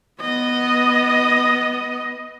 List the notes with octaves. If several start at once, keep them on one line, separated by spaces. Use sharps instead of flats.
B3 D#5